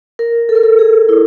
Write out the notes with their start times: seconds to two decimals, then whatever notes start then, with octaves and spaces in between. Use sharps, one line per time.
0.19 A#4
0.49 A4
0.55 A#4
0.63 A4
0.79 G#4
1.09 E4